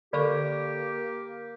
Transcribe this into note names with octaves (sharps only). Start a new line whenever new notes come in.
D3 A#3 G4 A4 D5 C#6